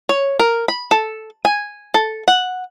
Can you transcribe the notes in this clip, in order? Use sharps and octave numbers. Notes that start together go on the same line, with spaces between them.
C#5
A#4
B5
A4
G#5
A4
F#5